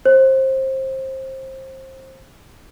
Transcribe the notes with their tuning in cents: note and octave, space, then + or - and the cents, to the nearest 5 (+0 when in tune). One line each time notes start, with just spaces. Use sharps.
C5 +25